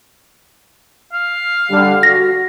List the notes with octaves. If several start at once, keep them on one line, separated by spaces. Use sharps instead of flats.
F5
D3 G3
F#4 A#6